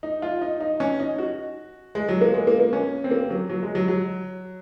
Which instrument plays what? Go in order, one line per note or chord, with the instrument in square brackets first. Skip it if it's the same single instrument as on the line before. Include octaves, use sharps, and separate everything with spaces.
[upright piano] D#4
F4
D#4
D#4
C#4
D#4
F#4
G#3
F#3
A#3
G#3
A#3
A#3
C#4
C4
A#3
F#3
F#3
G#3
F#3
F#3